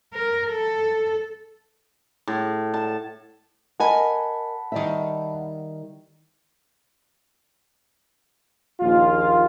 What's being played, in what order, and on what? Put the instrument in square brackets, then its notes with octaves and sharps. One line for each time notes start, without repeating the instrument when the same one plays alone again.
[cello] A#4
A4
[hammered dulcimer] A2
A5
[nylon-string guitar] A#4 D#5 G#5 [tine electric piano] F#5 A5 B5
[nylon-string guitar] D#3 G3 E5
[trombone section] A#1 D#2 F4